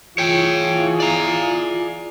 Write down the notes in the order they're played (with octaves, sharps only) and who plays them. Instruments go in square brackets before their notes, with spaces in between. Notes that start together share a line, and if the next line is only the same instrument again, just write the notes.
[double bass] E3 [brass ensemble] F4 G#4 [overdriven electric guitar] C#5 G5
[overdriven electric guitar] D5 A#5